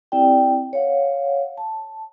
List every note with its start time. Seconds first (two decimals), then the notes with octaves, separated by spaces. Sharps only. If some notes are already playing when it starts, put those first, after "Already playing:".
0.12 C4 E4 G4 D5 G5
0.73 C#5 F5 F#5
1.58 A5